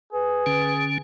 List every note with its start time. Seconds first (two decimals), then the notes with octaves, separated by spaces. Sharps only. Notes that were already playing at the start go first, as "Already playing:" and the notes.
0.13 G#4 B4
0.46 D3 C#4